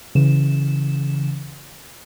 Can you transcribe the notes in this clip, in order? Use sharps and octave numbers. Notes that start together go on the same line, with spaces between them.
C#3 E3 E7